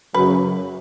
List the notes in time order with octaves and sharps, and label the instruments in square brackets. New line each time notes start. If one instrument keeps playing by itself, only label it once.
[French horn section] F#2 C#3 F#3 [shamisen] B4